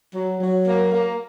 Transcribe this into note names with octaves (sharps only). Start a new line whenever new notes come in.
F#3
F#3
A#3
A#3